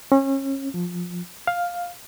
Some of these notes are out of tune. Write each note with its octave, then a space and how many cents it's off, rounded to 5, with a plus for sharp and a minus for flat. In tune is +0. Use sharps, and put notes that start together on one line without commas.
C#4 -30
F3 +15
F5 +5